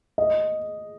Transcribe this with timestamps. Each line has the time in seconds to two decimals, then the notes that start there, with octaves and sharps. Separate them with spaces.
0.18 D#5